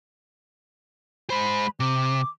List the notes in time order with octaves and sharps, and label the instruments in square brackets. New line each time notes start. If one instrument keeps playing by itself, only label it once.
[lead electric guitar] G#3 C5 [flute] B5
[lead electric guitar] C3 [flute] D6